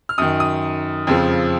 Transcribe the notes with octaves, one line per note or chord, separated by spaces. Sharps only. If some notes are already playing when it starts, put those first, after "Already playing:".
F6
F#2 D#3 D#6
D#6
F2 C#3 F3